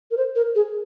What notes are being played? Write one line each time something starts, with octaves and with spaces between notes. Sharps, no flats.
A#4
C5
A#4
G#4